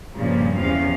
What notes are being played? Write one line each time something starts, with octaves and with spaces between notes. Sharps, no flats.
G2 A#2 C#3 F3
E2 C3 F3 C#4 F5